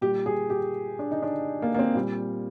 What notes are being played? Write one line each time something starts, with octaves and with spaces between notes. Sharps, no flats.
A#2 G3 G4
G#4
G4
D4
D#4
D4
A#3
A#3
C4
A#2 G3